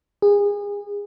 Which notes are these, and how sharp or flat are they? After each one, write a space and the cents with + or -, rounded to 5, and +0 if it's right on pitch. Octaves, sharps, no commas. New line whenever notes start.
G#4 -30